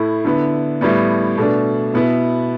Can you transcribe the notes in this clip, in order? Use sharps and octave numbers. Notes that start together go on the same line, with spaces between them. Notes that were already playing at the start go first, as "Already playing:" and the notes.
Already playing: A2 A3 E4
D3 B3 E4
A2 G3 B3
B2 A3 D4
B2 B3 E4